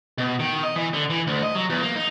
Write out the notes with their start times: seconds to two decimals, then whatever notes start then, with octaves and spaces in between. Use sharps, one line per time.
0.18 B2
0.39 D#3
0.63 D#5
0.76 E3
0.94 D3
1.10 E3
1.27 D2
1.43 D#5
1.55 F#3
1.70 E2
1.82 A#3
1.96 D#4